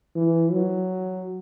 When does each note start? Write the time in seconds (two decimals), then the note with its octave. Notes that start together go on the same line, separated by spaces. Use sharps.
0.16 E3
0.52 F#3